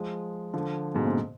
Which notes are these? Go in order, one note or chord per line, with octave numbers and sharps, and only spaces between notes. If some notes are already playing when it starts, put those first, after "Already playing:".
Already playing: F3 G#3
D3 F3
G#2 B2
F#2 A#2